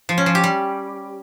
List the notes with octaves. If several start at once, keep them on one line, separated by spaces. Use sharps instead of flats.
F3
C#4
F3
G4
G3